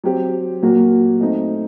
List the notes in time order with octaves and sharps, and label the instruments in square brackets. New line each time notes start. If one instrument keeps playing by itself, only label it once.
[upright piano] F#3 C4 G4
A#2 F#3 A#3 F#4
A3 C4 D#4